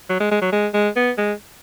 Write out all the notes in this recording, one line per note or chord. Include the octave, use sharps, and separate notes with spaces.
F#3
G#3
G#3
F#3
G#3
G#3
B3
G#3